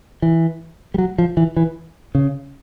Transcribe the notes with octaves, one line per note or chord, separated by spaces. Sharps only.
E3
G3
F#3
F3
E3
E3
C#3